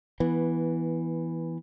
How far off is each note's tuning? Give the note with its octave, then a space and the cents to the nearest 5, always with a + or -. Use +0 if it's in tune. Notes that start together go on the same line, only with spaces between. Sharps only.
E3 +0 B3 -10